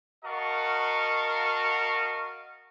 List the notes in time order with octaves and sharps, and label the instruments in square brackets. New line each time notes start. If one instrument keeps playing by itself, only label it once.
[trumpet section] F#4 A#4 D#5 F5 A5 C#6